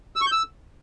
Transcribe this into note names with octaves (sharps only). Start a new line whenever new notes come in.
E6
C#6
G6
E6